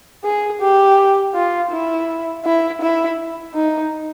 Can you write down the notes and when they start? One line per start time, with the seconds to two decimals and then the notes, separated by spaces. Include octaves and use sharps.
0.24 G#4
0.61 G4
1.35 F4
1.71 E4
2.45 E4
2.81 E4
3.55 D#4